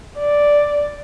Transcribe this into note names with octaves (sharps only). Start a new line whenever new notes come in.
D5